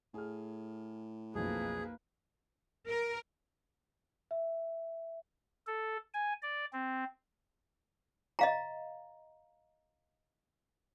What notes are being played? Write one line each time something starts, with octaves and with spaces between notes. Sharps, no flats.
A2 G#4 F6
B1 F2 A#3 G#4 B4
A#4
E5
A4
G#5
D5
C4
D#5 F5 A#5